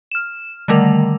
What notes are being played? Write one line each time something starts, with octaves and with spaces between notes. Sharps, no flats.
F6 E7
D3 D#3 G3 A3 A#4 F#5